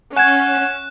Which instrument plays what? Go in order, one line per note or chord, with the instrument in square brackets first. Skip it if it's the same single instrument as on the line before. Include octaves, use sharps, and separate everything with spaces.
[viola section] C#4 [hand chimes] F#5 [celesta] G#5 G#6 [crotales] F#6 E7